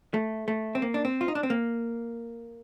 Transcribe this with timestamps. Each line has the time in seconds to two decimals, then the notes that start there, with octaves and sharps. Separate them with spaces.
0.14 A3
0.48 A3
0.75 C4
0.82 A#3
0.94 D4
1.05 C4
1.21 F4
1.28 D#4
1.35 D4
1.43 C4
1.50 A#3